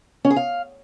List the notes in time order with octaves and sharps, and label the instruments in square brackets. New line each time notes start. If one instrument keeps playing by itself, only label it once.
[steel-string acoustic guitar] C#4
G#4
F5